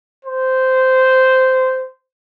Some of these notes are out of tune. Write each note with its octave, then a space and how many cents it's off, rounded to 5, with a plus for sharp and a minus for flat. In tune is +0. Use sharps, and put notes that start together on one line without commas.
C5 -10